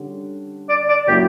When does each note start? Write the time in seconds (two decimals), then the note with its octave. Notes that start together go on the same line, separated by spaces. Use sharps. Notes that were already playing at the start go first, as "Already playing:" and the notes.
Already playing: D3 G3 C#4
0.69 D5
0.89 D5
1.08 F#3 A#3 C#4 E4 G4